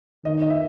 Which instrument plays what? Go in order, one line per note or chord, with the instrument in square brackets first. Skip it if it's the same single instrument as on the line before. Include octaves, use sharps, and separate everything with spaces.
[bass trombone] D#3 [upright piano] D#5
[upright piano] D#5
E5